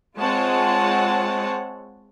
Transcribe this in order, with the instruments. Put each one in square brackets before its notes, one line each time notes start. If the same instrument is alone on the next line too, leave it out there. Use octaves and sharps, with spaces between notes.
[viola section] G#3 C4 F4 C#5 F#5 A5